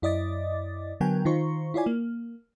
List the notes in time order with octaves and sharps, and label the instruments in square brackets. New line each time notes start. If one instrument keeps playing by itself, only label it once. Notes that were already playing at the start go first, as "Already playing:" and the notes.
[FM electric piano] F#2 E4 D5 D#5 D6 A6
D3 F#3 B3 A#4 G5 G#5
D#3 D#4 F4 C5 C#6
E4 F4 C#5 D5 G#5
A#3